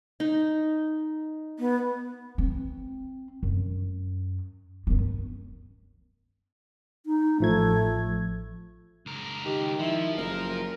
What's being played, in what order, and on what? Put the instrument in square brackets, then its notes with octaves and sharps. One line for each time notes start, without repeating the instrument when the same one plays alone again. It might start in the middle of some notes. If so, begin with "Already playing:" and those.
[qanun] D#4
[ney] B3
[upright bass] C4
F#2
F#2 B3
[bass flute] D#4
[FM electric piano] A1 F3 G#6 [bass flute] A3
[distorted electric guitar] C#2 A#4
[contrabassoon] D#3 [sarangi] G4
[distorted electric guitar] F3 [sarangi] E4
[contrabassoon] F#1 [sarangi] A#4